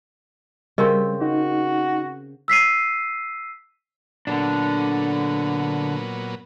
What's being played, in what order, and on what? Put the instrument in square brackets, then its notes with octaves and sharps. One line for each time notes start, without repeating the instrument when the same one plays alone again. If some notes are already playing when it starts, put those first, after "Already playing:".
[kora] C#3 C4 [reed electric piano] G3 [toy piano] G4 A#4 D#5
[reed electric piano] D#4 [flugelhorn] F#4
[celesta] E6 B6 C7 D#7
[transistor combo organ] A#2 F#3 B3 [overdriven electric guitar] D3 D4